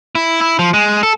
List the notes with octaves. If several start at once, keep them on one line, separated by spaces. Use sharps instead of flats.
E4
E4
F3
G#3
A4